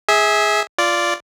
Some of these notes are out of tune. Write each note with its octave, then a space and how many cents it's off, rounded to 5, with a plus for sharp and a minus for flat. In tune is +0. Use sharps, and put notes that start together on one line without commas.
G#4 +0 E5 -25
F4 -10 D5 -5